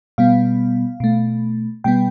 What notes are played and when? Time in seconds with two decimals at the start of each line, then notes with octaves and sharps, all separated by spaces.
0.18 B2 G3 B3 F5
1.00 B2 A3
1.84 B2 G3 B3 G5